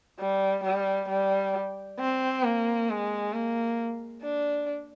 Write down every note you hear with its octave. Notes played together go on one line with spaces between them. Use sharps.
G3
G3
G3
C4
A#3
G#3
A#3
D4